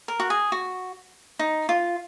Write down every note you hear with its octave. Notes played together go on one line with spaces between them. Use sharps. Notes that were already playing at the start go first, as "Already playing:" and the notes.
A#4
F#4
G#4
F#4
D#4
F4